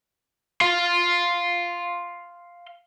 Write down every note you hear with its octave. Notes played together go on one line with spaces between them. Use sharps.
F5 C6